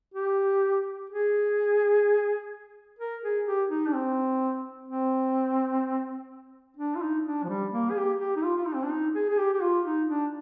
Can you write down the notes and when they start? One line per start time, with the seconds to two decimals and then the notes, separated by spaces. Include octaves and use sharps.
0.14 G4
1.10 G#4
2.99 A#4
3.23 G#4
3.47 G4
3.70 D#4
3.87 D4
3.93 C4
4.88 C4
6.77 D4
6.95 F4
7.01 D#4
7.25 D4
7.44 F3
7.49 G3
7.72 A#3
7.91 G#4
7.96 G4
8.19 G4
8.36 D#4
8.43 F4
8.57 F4
8.67 D#4
8.75 C4
8.84 D4
8.91 D#4
9.15 G#4
9.30 G#4
9.38 G4
9.53 G4
9.62 F4
9.85 D#4
10.08 D4